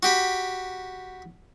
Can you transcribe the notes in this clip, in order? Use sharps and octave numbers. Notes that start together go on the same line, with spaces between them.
F#4 G4 B5